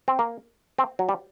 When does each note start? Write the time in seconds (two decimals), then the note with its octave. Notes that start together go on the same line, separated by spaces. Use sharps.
0.08 C4
0.19 A#3
0.79 C4
0.99 F#3
1.09 G3